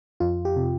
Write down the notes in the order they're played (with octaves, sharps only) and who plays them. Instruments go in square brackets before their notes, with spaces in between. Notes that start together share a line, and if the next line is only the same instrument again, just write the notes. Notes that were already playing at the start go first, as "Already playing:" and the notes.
[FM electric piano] F2 F4
G4
C3